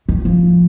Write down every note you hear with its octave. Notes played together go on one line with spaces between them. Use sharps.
D#3
F3